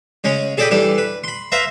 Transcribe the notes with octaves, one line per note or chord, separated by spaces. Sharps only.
C#3 G#3 C#4
G#4 A4 D5 D#5 G5 B5
E3 G3 D4 A4
B4
B5 C6
B4 C5 E5 F5 A#5